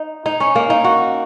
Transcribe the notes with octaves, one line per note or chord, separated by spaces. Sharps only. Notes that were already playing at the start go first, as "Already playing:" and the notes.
Already playing: D#4
D#4
C#4
A#3
D#4
F#4